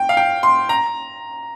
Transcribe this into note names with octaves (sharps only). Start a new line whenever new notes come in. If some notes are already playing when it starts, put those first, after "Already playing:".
Already playing: G5
F5
G5
C6
A#5